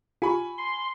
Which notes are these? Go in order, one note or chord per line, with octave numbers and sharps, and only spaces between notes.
F4 G4 G#5 B5 C#6
C6